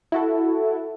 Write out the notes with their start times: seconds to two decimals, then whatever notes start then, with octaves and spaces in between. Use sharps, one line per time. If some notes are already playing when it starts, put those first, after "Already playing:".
0.12 E4 F#4 A4